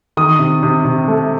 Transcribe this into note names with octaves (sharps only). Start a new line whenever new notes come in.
D#3 D#6
C3
C3
C3
A3